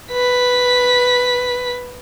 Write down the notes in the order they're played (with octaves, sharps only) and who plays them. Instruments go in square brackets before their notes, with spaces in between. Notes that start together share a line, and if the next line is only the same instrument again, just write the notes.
[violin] B4 B6